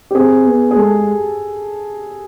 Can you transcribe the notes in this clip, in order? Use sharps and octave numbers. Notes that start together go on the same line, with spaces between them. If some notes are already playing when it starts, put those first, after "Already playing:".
G4
C4 G#4
B3
G#4
G#3 A4